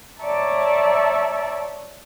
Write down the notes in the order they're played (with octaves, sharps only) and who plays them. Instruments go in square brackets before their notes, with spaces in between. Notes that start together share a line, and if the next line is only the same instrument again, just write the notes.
[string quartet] C#5 D5 E5 A5 A#5